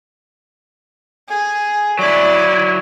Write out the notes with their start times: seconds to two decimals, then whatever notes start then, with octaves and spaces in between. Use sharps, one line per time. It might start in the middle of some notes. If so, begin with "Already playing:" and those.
1.28 G#4
1.99 F#3 E4 D5